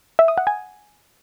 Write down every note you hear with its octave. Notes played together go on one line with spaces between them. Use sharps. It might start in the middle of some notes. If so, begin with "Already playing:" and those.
E5
D#6
F#5
G#5